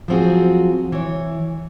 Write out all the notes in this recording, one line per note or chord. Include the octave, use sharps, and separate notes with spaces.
F3 F#3 C4 F#4 G#4
E3 C#5